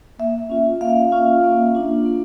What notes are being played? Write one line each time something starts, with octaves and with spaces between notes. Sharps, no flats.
A#3 E5
C#4 F4
A#3 F5
C#4 F4
A#3
D4 F4
A#3